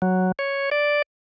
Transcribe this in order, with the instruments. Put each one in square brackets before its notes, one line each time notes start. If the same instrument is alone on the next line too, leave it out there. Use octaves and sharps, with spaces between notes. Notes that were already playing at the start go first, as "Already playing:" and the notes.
[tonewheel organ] F#3
C#5
D5